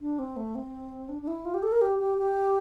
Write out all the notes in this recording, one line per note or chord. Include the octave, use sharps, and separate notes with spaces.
D4
C4
A3
C4
D4
D4
E4
F4
G4
A4
A#4
G4
G4
G4